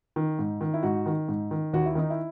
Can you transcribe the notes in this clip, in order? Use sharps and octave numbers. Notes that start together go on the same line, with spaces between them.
D#3
G#2
D#3
E4
G#2 F#4
D#3
G#2
D#3
D#2 F#4
E4
D#3 D#4
E4